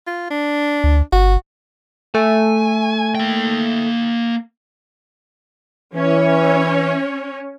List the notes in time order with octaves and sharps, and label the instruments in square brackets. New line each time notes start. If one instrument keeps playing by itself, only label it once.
[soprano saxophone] F4
D4
[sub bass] D2
[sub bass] G1 [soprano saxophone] F#4
[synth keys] A3 [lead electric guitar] G#5
[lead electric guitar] A#3 G5
[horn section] E3 [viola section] C#4 C#5